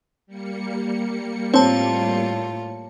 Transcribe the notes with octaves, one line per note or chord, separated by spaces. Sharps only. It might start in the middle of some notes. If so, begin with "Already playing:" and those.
G3 A#3 C#7
A2 C4 F4 C#5 A5